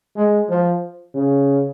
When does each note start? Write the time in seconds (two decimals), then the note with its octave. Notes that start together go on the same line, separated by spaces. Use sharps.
0.16 G#3
0.49 F3
1.14 C#3